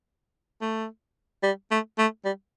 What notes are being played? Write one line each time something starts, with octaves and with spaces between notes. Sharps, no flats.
A3
G3
A3
A3
G3